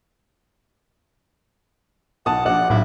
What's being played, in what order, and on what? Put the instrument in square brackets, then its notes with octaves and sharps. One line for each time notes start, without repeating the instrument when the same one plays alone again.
[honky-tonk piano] B1 [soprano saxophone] F#5 [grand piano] A5 D#6
[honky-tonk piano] A#1 D5 [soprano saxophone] F#5
[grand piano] B1 [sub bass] A2 [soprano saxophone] E4